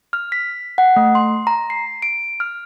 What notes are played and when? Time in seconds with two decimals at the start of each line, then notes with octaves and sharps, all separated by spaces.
0.13 F6
0.32 B6
0.78 F#5
0.96 A3
1.15 C6
1.47 A#5
1.70 C7
2.02 D7
2.40 F6